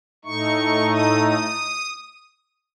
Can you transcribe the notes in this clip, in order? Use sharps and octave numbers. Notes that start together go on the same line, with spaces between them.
A2 A3 D#4 C#6
D#6
D#6